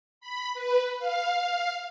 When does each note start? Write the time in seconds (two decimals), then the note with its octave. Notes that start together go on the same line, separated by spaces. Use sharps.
0.21 B5
0.54 B4
0.99 F5